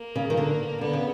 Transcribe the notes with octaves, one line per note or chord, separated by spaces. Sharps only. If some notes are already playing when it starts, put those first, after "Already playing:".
Already playing: A#3
C#3
D#3
D3
D3 B3
C#3